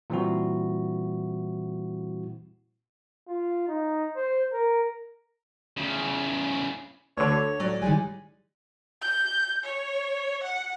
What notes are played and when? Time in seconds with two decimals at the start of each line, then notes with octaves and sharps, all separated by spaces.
0.10 A#2 E3 G3 C4 E4 F#4
3.28 F4
3.68 D#4
4.16 C5
4.52 A#4
5.77 E2 C#3
7.17 D2 D3 C#5
7.60 A2 F#3 D5
7.82 D#3 G3 G#3 G#5
9.01 G6
9.64 C#5
10.44 F#5